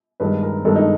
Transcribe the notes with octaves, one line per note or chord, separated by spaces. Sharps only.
G2 D#3 G#3 B4
A#4
G2 D#3 G#3 A4
D#4